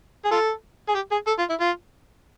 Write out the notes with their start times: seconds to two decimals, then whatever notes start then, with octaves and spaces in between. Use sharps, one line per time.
0.25 G#4
0.31 F4 A4
0.89 G#4
0.95 G4
1.11 G#4
1.27 A4
1.39 F4
1.50 E4
1.60 F4